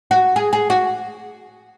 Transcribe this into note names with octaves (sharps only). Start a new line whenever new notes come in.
F#4
G#4
G#4
F#4